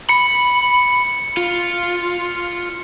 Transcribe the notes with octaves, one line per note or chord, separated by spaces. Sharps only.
B5 C#7
F4